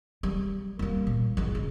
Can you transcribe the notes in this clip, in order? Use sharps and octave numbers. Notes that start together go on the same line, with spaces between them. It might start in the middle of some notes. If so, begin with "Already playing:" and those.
G3
G3 A#3
A#2
A1 G#3
C#3